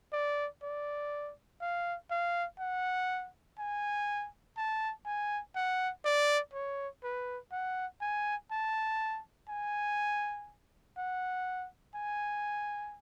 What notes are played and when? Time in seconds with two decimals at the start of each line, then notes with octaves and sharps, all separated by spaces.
0.13 D5
0.63 D5
1.61 F5
2.11 F5
2.59 F#5
3.59 G#5
4.57 A5
5.06 G#5
5.55 F#5
6.05 D5
6.53 C#5
7.03 B4
7.52 F#5
8.01 G#5
8.51 A5
9.49 G#5
10.98 F#5
11.95 G#5